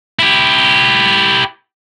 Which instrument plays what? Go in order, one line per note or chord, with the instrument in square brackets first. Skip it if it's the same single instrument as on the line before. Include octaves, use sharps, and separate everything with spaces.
[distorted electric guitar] E4 G4